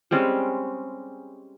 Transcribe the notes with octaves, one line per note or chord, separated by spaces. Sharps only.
G3 G#3 C4 C#4